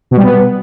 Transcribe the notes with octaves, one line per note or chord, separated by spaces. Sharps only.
B2
G3
B3